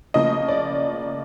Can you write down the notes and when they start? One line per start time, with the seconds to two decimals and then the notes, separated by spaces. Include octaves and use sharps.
0.14 C#3 F3 A#3 D#5
0.48 D5